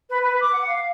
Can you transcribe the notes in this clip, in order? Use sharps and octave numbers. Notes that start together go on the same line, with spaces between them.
B4
B4
D6
F#5
F5